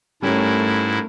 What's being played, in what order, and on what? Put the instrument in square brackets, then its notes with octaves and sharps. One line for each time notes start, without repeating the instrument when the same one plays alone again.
[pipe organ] G#2 E4 [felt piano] G3 C#4 [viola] A3 A#4